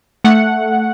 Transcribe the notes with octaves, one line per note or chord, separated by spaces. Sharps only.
A3 F#5